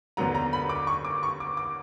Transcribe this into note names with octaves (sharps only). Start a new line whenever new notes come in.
D#2 D3 F#3 B3 A#5
A#5
B5
D6
C#6
D6
C#6
D6
D6